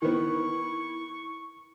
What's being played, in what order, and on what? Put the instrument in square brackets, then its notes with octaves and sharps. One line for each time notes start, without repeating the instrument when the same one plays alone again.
[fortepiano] D#3 B3 [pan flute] E4 [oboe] C#6